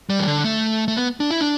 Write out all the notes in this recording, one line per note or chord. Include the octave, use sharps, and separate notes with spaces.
G3
E3
D3
A3
A3
B3
D4
E4
D4